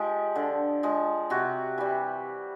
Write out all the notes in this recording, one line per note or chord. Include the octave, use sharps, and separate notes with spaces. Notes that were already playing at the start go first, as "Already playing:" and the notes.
Already playing: F3 G#3 G4
D3
F3 G#3
C3 F#4
E3 G3